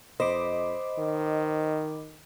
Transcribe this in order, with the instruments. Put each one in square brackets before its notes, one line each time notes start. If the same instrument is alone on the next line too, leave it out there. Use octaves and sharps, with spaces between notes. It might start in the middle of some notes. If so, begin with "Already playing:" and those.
[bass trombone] F2 [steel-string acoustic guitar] C5 [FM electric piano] D#5 B5 D6
[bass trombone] D#3